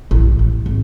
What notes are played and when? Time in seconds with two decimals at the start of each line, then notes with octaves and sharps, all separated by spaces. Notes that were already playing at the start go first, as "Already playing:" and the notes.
0.11 A1
0.25 G#2
0.39 A1
0.66 G#1